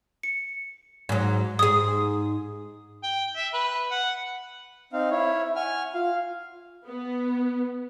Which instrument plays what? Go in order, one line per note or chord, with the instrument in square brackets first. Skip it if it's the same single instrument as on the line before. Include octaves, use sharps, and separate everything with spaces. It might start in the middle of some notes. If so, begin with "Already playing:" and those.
[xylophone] C#7
[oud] G#2 F#3
[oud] G#2 G#4 [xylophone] D#6
[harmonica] G5
E5
B4
F#5
[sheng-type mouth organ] C4 D#4 F5
[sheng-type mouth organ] E4 C#5 [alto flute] E5
[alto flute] F#5 [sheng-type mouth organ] G#5 F6
[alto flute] F4 [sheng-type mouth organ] F5
[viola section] B3